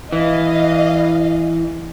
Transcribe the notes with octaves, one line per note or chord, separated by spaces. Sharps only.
E3 D#5 F5